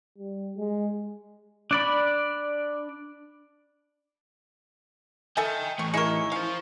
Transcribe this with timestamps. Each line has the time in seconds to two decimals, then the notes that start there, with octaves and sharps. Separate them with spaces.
0.18 G3
0.57 G#3
1.71 D4 D5 B5
5.37 A4 D#5 E5 G5 G#5
5.79 E3 A3 C#6
5.94 D#4 E4 G#4 A#4 E5 C#6 C#7
6.32 C#4 C5 F5